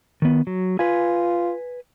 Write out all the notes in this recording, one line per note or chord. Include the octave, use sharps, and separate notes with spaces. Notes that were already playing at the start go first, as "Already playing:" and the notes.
D#3 B3
F#3
F4 B4 G#5